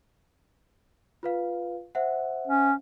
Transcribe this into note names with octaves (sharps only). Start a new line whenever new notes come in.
F4 B4 F5
C5 E5 F#5
C#4